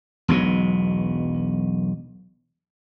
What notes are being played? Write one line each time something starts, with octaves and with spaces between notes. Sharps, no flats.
E1 B1 B2 F#3